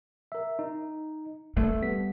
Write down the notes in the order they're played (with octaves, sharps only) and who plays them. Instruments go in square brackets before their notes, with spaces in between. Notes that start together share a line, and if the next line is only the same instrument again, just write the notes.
[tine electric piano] A#4 E5
D#4
[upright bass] A3 [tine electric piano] E5
[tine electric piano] G3 B3 B6